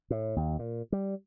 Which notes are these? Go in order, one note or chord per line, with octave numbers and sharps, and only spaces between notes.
A2
D#2
A#2
G3